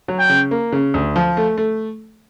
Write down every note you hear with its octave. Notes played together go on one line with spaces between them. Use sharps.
F#3
G5
C#3
A#3
C#3
D2
F3
A3
A3